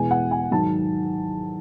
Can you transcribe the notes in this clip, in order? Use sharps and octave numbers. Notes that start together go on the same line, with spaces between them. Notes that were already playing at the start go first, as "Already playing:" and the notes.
Already playing: E2 B2 G#3 G#5
F#5
G#5
G#2 D#3 F#3 A5